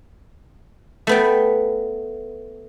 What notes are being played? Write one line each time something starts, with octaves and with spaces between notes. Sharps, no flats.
A3 B3 G5